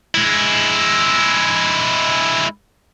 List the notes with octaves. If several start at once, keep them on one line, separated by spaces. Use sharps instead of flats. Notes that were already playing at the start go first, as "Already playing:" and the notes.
G#3 E4